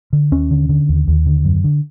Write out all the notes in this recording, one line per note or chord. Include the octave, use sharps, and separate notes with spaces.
D3
D#2 C#4
D3
D3
D#2
D#2
D3
F#2
D3